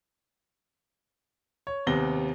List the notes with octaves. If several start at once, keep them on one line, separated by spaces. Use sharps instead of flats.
C#5
D#2 C3 B3 A#6 G7